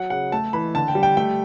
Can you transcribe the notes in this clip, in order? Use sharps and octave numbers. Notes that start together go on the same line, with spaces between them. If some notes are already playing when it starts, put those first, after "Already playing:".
Already playing: F#3 F#5
C#3 F#5
A3 A5
E3 B5
D3 A5
G5
G3
G5
A3 G5